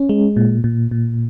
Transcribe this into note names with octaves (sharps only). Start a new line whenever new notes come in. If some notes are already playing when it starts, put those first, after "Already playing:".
Already playing: C#4
G#3
A#2
A#2
A#2